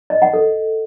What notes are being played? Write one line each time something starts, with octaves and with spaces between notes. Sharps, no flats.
D#5
F#5
A4